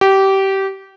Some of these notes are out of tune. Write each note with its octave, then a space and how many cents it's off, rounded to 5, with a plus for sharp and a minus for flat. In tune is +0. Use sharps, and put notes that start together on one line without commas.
G4 -20